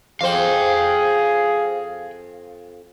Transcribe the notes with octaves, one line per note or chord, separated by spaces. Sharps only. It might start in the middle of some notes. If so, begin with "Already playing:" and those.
F2 G#4 C5 F5 G5